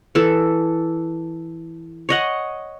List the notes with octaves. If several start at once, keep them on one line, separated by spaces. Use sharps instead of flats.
E3 A4
C#5 D#5 F#5